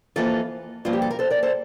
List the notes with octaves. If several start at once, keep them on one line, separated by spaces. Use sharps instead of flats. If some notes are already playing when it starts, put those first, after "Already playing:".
F2 E3 A#3 F4 A4
G2 F3 A#3 F4
G4
A4
A#4
A4 C5
A#4 D5
A4 C5